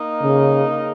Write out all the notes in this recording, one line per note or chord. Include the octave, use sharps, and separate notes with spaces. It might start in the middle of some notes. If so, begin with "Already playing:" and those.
Already playing: A#3 D#4 A#4
C#3